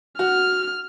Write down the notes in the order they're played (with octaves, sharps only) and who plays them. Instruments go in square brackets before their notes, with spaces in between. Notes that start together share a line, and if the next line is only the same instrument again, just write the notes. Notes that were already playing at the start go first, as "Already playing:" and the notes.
[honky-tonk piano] F#4 [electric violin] F6